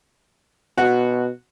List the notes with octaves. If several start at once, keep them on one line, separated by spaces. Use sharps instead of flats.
B2 F#4